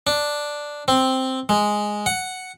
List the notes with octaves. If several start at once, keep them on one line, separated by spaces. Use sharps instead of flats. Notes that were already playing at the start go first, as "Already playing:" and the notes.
D4
C4
G#3
F#5